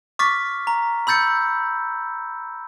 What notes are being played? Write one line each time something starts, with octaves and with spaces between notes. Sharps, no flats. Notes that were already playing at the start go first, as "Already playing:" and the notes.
C#6 D6 F6 A6 B6
A#5
B5 E6 G6 A6 C#7